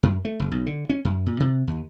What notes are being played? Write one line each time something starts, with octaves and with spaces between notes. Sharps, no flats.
F#2
A3
F#1
B1
D3
C#4
F#2
A#2
C3
D#2